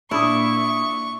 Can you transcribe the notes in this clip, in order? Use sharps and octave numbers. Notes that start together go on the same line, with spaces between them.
A#2 D4 E4 C#6 D#6